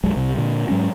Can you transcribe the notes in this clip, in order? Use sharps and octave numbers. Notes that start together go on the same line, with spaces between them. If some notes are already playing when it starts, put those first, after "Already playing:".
B1 F#2 F#3 G#3
C2 C3 G3
A#2 D3
G#2 F#3 G#3 C#4